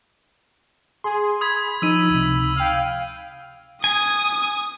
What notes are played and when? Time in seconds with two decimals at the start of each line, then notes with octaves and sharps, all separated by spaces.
1.04 G#4 C6
1.41 B5 D#6 G#6
1.82 F3 D#4 E6 D#7
2.10 C#2 C3
2.56 F5 G5
3.84 G#5 D#6